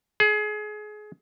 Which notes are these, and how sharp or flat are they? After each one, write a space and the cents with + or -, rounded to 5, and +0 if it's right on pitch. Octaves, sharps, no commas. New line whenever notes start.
G#4 +25